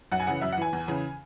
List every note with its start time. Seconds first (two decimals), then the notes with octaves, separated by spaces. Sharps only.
0.12 F#2 F#5
0.20 G#5
0.27 C#3 E3 F#5
0.41 F#2 E5
0.53 F#5
0.57 E3 G#5
0.73 E2
0.88 C#3 E3